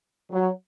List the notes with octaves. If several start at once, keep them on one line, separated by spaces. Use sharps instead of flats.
F#3